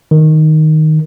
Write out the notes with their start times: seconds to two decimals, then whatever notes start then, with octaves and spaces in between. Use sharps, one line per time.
0.11 D#3